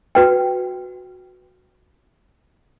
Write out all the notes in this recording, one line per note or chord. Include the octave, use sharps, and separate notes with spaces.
F#4 B4 G5